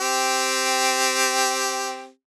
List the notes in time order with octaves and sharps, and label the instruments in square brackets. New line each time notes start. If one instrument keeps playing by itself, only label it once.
[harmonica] C4 G4